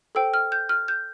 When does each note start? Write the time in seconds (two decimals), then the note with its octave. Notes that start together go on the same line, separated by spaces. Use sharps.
0.15 A4 C5 G5 E6
0.34 F6
0.52 G6
0.69 F6
0.88 G6